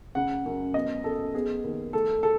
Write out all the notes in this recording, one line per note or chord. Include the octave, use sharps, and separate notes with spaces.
C#3 F#5
F#2
B3 D#5
F#2 A4
B3 G#4
D#2
A3 A4
A3 A4